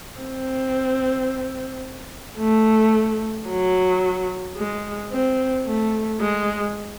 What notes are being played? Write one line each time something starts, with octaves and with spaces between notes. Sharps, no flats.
C4
A3
F#3
G#3
C4
A3
G#3